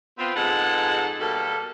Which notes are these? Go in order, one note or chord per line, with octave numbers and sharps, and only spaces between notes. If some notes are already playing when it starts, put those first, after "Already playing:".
B3 C4 F4
F2 G#2 G#3 A4 B4 F#5
B2 G3 A#3 A4